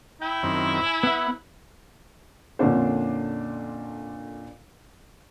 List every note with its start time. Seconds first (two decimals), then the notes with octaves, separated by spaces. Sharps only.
0.22 E4 G5
0.43 F#2 D#3 C4
0.86 G#5
1.03 B3 B4 E5 F#5
2.59 F2 A#2 D3 C#4 D4 C5